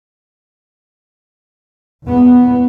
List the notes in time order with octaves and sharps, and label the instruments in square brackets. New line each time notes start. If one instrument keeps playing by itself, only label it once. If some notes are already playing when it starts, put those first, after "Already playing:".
[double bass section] E2 B3